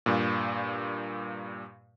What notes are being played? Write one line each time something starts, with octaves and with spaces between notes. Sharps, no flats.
G2 A#2